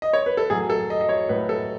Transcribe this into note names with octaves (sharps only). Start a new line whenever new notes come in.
D#5
C#5
B4
A4
A2 F#3 G#4
A4
D#5
D#5
C#5
A2 F#3 B4
A4